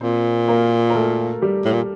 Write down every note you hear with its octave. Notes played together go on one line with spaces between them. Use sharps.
A#2 C4 C5
A#3 A#4
A#4
A3 A4
G3 G4
A2
A#2